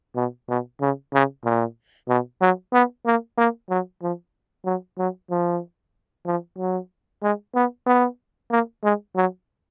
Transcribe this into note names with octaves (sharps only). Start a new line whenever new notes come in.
B2
B2
C#3
C#3
A#2
B2
F#3
B3
A#3
A#3
F#3
F3
F#3
F#3
F3
F3
F#3
G#3
B3
B3
A#3
G#3
F#3